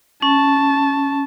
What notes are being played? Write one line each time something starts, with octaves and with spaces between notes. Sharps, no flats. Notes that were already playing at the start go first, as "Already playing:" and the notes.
C#4 A5